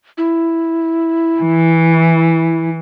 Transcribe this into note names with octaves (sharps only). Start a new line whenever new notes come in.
E4
E3